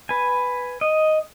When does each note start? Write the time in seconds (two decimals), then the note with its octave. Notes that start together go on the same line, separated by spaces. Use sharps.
0.09 B4 G#5
0.81 D#5